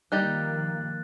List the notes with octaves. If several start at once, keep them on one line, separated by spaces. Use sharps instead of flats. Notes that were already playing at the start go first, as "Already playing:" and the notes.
D#3 F3 G3 A#3 D#4 G4 F#6 A6